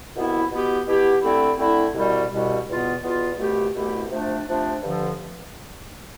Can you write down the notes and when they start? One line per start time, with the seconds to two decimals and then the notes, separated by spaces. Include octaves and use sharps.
0.14 C2 B2 B3 E4
0.51 B2 B3 E4 G4
0.86 B2 B3 E4 G4
1.22 D3 A3 C4 E4
1.58 D3 A3 C4 E4
1.95 C2 B2 G3
2.29 C2 B2 G3
2.66 E2 B2 B3 F4
3.02 E2 B2 B3 F4
3.37 C2 B2 A3 E4 G4
3.74 C2 B2 A3 E4 G4
4.10 C3 F3 A3 D4
4.46 C3 F3 A3 D4
4.82 G2 D3 F3